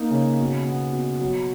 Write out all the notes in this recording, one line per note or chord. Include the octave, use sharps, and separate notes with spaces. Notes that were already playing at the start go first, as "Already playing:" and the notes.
Already playing: A#3 D#4
C#3
B2
B3
B2
F#3